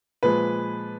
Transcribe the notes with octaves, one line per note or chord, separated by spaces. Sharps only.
A#2 F3 G#3 B4